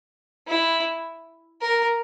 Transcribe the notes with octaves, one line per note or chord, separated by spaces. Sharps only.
E4
A#4